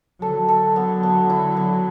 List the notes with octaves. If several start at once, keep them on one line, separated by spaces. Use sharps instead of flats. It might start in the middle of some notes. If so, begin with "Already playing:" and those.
D3 F#3 A4
A4
B3
B3
E4
B3